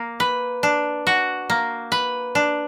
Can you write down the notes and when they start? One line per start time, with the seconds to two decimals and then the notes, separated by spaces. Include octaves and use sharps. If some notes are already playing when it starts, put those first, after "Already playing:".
Already playing: A#3
0.20 B4
0.63 D4
1.07 F#4
1.50 A#3
1.92 B4
2.35 D4